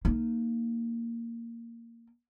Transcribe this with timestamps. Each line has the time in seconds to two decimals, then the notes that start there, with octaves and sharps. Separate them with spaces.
0.05 A#3 D#4